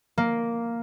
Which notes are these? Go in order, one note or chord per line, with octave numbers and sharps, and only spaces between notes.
A#3